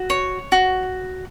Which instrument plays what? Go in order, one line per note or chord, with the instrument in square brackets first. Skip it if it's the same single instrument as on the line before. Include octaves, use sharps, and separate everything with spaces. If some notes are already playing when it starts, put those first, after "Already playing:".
Already playing: [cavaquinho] F#4
C#5
F#4